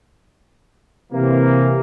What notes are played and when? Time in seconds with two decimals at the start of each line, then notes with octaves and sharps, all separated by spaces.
1.12 C3 E3 A#3